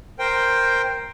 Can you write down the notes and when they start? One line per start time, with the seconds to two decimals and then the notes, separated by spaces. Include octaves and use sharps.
0.19 A#4 C5 G5